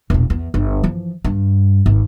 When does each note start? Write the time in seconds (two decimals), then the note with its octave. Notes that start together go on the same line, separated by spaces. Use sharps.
0.10 E1 A#2
0.30 E2
0.54 G1
0.83 E3 F3
1.24 G2
1.86 G#1